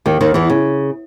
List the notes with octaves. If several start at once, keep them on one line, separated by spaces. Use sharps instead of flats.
D#2 D#3
D#2 D#3
E2 E3
C#3